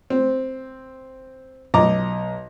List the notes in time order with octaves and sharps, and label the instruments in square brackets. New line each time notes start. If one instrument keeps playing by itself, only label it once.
[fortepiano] C4
B1 D#5 A#5 D6